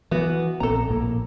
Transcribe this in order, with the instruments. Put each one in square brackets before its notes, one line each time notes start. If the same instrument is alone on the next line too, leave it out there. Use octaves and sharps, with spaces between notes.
[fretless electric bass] E3 [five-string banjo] B3 F#4
[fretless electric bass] A#1 B3 C4 [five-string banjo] A4 A#5
[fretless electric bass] A#1 A2 A#3